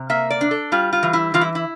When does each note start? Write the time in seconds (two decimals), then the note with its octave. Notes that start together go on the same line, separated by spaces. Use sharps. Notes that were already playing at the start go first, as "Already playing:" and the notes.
Already playing: C3
0.10 A#3 E5
0.30 D5
0.41 D4
0.51 A4
0.72 G3 F4
0.93 F4
1.03 E3
1.13 E4
1.34 E3 F4
1.41 E4
1.55 E4